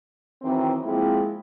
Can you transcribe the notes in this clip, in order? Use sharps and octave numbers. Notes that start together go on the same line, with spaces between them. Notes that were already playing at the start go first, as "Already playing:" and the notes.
F#2 D#3 E3 C4
F3 G#3 A#3 C4 E4